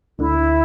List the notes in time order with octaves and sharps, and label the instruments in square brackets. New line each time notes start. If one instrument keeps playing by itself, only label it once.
[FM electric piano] D2 D3 [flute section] E4